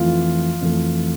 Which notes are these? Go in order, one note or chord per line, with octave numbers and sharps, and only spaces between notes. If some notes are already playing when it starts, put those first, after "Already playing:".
Already playing: F2 E3 A3 F4
F2 E3 A3